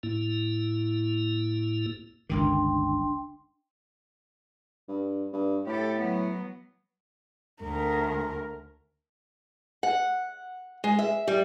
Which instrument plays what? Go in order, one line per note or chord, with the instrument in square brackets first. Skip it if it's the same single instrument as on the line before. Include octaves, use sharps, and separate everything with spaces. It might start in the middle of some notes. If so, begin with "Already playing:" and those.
[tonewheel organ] A2 A#3 E4
[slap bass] G1 C#2 D#3 [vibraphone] D4 G5 C6
[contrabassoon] G2
G2
[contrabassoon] A2 [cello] G4 A4
[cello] F#3 B3
[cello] D2 [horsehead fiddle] A#4
[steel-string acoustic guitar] F#5
G#3
E5
G3